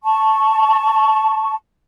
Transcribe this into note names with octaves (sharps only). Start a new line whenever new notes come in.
A5 C#6